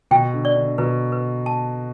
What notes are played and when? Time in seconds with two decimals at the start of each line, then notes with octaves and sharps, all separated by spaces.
0.11 B2 G5
0.34 D3
0.45 D5
0.56 D3
0.78 B2 B4
1.12 B4
1.46 A5